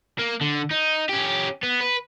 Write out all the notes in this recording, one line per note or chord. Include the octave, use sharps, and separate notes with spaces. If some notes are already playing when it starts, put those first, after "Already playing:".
A#3
D3
D#4
C#4 G4
B3
B4